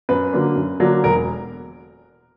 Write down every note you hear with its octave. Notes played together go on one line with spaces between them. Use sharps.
F#2 B4
D3 F#3 A#3 D4
F#2
D3 F#3 A#3 D4
E1 A#4